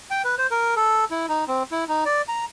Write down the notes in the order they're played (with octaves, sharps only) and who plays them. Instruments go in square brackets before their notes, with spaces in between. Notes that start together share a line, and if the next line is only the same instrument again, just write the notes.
[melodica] G5
B4
C5
A#4
A4
E4
D#4
C4
E4
D#4
D5
A#5